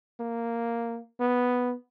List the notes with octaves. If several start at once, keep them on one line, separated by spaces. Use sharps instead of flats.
A#3
B3